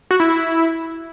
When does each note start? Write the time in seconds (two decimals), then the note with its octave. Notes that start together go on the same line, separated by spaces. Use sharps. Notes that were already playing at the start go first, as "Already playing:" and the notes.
0.11 F#4
0.20 E4